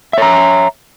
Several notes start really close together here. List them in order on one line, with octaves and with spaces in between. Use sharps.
E5 C#5 A#5